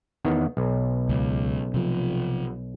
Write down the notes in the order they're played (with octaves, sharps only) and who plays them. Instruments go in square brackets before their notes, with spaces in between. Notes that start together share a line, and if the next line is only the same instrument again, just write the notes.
[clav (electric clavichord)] E2 D#3 B3
B1
[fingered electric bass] C#2
C3 F3